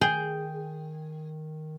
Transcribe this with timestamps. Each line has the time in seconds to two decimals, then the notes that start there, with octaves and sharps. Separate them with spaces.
0.01 D#3 G#4 G5